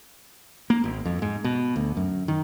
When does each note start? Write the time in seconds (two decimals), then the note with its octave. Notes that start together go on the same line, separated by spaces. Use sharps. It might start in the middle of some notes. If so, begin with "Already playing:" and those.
0.70 A#3
0.84 G#1
1.05 F2
1.22 G#2
1.44 B2
1.76 D2
1.97 F#2
2.28 D#3